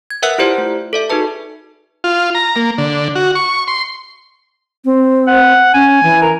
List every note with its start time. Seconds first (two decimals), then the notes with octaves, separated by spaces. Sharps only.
0.10 G#6
0.23 A#4 B4 E5 F#5 E6 F#6
0.38 E4 F4 G4 C5 D5
0.58 A3
0.93 A4 D5 E5
1.10 D#4 F#4 G#4 B4 A5
2.04 F4
2.35 A#5
2.56 A#3
2.78 D3
3.15 F#4
3.35 C#6
3.68 C6
4.85 C4
5.27 F#5
5.74 C#4 G#5
6.03 E3
6.22 A#4